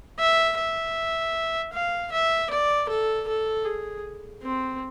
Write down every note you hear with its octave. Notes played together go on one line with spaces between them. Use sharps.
E5
E5
F5
E5
D5
A4
A4
G#4
C4